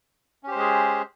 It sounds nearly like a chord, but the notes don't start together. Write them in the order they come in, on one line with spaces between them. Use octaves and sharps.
C#4 G4 C5 G#3 G#4